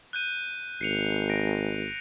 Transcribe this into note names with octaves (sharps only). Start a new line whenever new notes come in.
F#6 G6 D#7
G#1 C7 C#7 F7
A#6 D7